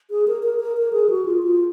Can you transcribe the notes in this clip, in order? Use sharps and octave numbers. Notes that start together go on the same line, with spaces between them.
G#4
A#4
A#4
A#4
A#4
G#4
F#4
F4
F4